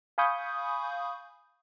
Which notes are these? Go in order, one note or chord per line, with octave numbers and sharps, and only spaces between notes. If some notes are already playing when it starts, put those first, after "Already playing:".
F5 G#5 B5 C#6 D#6 G6